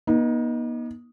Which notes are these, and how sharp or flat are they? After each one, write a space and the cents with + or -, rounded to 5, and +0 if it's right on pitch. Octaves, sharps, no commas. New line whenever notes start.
B3 -45 D#4 +0